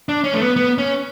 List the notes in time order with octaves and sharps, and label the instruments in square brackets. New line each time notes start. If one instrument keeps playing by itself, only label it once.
[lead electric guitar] D4
C#4
A3
B3
B3
C#4